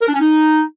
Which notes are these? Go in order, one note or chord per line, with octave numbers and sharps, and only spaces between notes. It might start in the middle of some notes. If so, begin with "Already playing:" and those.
A#4
D4
C#4
D#4